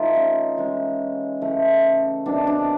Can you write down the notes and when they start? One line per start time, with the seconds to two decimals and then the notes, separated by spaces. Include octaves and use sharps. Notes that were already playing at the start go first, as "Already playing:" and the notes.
Already playing: E3 A3 D#4 F4
0.15 C#4
0.57 E3 G#3 C#4
1.41 C#3 E3 A3
2.26 C3 D#3 F#3 B3 D4
2.47 D4